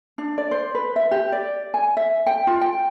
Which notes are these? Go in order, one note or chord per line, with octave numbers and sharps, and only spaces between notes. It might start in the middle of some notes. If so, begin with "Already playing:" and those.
D4
D5
C5
B4
E5
G4
D5
G#5
E5
G5
F4
G5